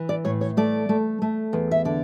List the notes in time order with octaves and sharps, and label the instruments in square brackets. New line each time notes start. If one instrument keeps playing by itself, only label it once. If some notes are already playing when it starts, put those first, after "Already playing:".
Already playing: [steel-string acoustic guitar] E3
D5
A2 C#5
C#5
A3 D5
A3
A3
E2
E5
D3 D5